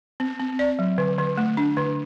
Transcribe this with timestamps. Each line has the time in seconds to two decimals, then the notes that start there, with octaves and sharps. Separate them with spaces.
0.20 C4
0.40 C4
0.59 D5
0.79 F#3
0.98 D3
1.18 D3
1.38 A3
1.57 D4
1.77 D3